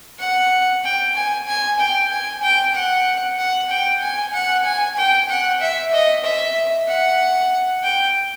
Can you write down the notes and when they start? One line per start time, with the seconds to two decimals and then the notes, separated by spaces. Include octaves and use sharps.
0.20 F#5
0.84 G5
1.15 G#5
1.48 G#5
1.80 G5
2.11 G#5
2.43 G5
2.74 F#5
3.39 F#5
3.70 G5
4.02 G#5
4.33 F#5
4.65 G#5
4.97 G5
5.29 F#5
5.61 E5
5.93 D#5
6.24 E5
6.88 F#5
7.83 G5